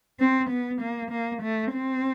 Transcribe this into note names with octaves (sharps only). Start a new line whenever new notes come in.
C4
B3
A#3
A#3
A3
C4